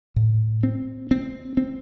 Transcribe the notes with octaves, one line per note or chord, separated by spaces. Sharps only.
A2
C4
C4
C4